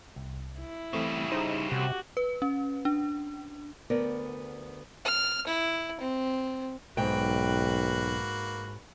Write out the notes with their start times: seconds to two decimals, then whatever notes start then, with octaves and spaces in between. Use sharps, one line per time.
0.16 C2
0.59 E4
0.93 C#3 E3 G3 A3 C4
1.32 D#4 G#4 C5
1.72 C3 F#4 G4
2.17 B4
2.42 C#4
2.85 D4
3.90 D2 B3 A#4 D5
5.05 F6
5.48 E4
6.01 C4
6.97 B1 G#2 A#3 F#4 B4 G5